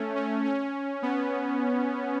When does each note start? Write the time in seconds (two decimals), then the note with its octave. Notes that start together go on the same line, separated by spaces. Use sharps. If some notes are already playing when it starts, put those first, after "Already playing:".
Already playing: A3 C#4
0.16 C#4
0.45 C#4
1.02 B3